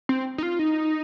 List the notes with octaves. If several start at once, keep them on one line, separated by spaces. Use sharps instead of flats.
C4
D#4
F4
D#4